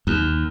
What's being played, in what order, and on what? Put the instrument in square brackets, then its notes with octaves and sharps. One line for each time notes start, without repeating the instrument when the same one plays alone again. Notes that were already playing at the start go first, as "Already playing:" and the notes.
[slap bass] D#2